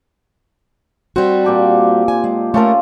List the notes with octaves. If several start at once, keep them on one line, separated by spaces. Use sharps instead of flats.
G3 C4 F#4
A#2 G4 A4
G#5
G#3
A3 C#4 F4 A4 A#4